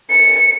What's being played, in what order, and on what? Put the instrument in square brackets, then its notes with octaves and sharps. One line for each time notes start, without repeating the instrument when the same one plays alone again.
[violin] C#7